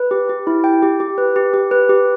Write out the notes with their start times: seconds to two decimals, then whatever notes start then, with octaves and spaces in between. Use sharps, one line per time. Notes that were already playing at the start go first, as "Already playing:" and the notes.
Already playing: B4
0.11 G4
0.29 G4
0.47 E4
0.64 G5
0.82 G4
1.00 G4
1.18 B4
1.36 G4
1.54 G4
1.71 B4
1.89 G4